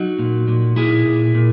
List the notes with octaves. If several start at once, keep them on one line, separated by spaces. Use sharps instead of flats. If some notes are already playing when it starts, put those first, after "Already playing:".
Already playing: F#3 D#4 F#4
A#2
A#2
A#2 E4 G#4
A#2
A#2